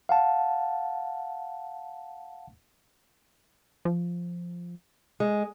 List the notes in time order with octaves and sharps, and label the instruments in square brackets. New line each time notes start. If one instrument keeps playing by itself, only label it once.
[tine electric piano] F5 F#5 A5
[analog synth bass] F3
[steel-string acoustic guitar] G#3